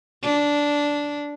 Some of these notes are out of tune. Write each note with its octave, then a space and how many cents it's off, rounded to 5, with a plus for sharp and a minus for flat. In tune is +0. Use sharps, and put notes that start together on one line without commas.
D4 -10